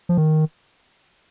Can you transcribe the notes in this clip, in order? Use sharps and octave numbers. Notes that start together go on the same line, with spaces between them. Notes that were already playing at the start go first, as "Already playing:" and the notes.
F3
D#3